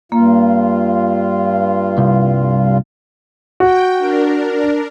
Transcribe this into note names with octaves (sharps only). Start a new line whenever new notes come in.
G2 A#3 F4
C2
F#4 G5
D4 A#4